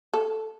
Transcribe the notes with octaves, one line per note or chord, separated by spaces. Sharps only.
A4